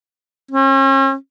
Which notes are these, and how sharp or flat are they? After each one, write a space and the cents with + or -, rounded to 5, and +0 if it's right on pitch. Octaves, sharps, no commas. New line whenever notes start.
C#4 -40